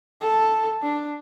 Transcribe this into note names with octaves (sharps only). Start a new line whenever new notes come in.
A4
D4